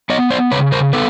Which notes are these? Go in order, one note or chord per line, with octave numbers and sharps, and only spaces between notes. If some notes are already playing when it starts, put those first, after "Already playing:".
B3 C#5 D#5
C5 D5
C#3 B4 C#5
A#4 C5
B3 A4 B4